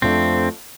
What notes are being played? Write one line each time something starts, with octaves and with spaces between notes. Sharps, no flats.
F2 F3 A3 C4 D4